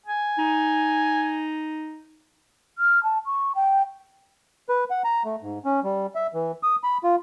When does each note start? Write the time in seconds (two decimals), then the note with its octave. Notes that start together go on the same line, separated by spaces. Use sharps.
0.06 G#5
0.38 D#4
2.78 F6
3.04 A5
3.26 C#6
3.55 G5
4.69 B4
4.91 F#5
5.04 A#5
5.25 A3
5.42 G#2
5.65 C#4
5.84 G3
6.15 E5
6.34 E3
6.63 D#6
6.84 B5
7.04 F4